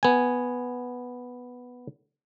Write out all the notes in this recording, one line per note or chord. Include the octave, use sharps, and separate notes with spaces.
B3 G#5